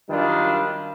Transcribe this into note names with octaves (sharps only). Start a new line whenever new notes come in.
F#2 D#3 G3 D4 F4